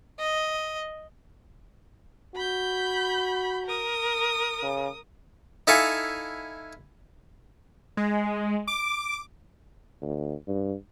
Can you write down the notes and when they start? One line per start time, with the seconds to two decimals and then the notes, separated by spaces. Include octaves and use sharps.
0.19 D#5
2.35 F#4 B5 G6
3.66 A#4 D#6
4.63 C#3
5.67 D#4 E4 A4 F5 G#5 C#6
7.97 G#3
8.67 D6
10.02 D2
10.48 G2